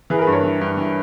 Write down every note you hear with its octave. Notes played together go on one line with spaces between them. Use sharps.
E3 G#4 B4
A#4
G#4 B4
G2
A#4 C#5
E3
G2
E3